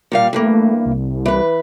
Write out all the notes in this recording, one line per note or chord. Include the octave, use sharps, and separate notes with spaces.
A#2 G3 F5
E2 G2 A3 A#3
C2
E3 B4